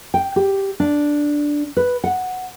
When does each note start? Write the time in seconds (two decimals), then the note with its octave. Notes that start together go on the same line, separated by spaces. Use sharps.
0.14 G5
0.36 G4
0.80 D4
1.77 B4
2.04 F#5